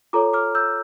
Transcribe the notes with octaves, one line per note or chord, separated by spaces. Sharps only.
F4 A4 C#5 A#5 D6
D6 F6
E6 G6